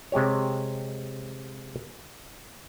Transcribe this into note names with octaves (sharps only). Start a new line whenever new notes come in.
C3 G#3 G4 C#5